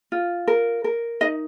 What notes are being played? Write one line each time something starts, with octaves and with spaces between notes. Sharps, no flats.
F4
A#4
A#4
D#4 D#5